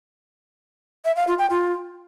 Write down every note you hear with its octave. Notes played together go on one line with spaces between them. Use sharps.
E5
F5
F4
G5
F4